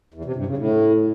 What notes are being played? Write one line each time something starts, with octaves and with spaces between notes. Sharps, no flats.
E2
C3
G2
C#3
A2